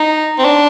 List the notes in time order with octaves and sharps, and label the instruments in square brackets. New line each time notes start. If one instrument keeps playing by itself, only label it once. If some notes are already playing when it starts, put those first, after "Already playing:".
Already playing: [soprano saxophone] D#4
C4
D4